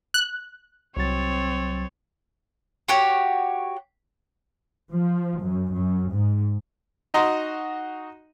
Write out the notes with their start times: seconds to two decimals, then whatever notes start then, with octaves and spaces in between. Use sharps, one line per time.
0.14 F#6
0.97 C2 F#3 C4 C#5 A6
2.88 F#4 G4 C#5
4.93 F3
5.42 F#2
5.75 F#2
6.13 G#2
7.14 D#4 F#4 D#5 A#5 C6